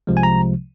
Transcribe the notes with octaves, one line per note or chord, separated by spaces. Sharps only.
C2 C3 F3 G#3
G#5
A#5